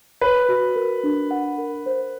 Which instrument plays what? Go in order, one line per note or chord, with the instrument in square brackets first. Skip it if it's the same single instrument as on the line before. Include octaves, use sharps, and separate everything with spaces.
[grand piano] B4 [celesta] C#5
[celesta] F#4
A#4
D4
F#5
A#4
C5